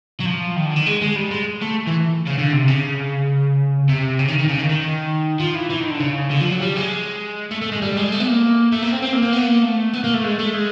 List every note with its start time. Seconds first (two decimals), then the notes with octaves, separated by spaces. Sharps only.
0.20 F#3
0.26 F3
0.56 D#3
0.66 D3
0.76 D#3
0.86 G#3
1.02 G#3
1.16 G3
1.31 G#3
1.62 A3
1.87 E3
2.26 C#3
2.38 D3
2.52 C3
2.68 C#3
3.89 C3
4.19 C#3
4.29 D#3
4.39 D#3
4.49 C#3
4.59 D#3
4.70 D#3
5.40 F3
5.55 E3
5.70 E3
5.80 D#3
5.90 D3
6.00 C#3
6.30 D3
6.40 F3
6.50 F#3
6.61 G3
6.76 G#3
7.51 A3
7.62 A3
7.72 G#3
7.82 G3
7.97 G#3
8.12 A3
8.20 B3
8.27 A#3
8.72 A3
8.83 A#3
8.92 C4
9.03 C4
9.13 A#3
9.23 A#3
9.33 B3
9.48 A#3
9.63 A3
9.93 B3
10.04 A#3
10.14 A3
10.23 G#3
10.39 A3
10.54 G#3